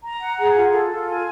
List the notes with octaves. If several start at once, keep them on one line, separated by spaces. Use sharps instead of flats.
A#5
F#5
G#4
F4
A4
F4
G#5